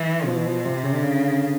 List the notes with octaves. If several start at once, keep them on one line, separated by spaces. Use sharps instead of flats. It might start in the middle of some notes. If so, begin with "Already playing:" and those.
Already playing: E3
B2 F3
E3
F3
C3 F3
C#3
D3
C#3